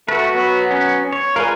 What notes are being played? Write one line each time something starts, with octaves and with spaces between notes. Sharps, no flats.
A3 F#4 B4
F#3 B3
C#4
C#5
G#3 D4 F4 A#4 B4 G#5